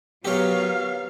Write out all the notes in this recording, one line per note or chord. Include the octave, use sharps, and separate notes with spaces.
F#3 B3 G4 A#4 C#5 F5